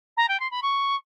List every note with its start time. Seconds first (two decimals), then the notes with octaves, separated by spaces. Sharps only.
0.17 A#5
0.28 G5
0.39 C6
0.51 B5
0.62 C#6